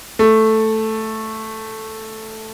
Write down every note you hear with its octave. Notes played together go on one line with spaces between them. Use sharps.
A3